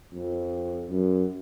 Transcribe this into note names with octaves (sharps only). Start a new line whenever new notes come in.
F2
F#2